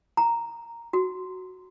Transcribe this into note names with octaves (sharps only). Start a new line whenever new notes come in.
A#5
F#4